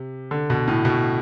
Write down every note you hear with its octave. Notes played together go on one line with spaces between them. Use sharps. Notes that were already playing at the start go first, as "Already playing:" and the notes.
Already playing: C3
D3
B2
A2
B2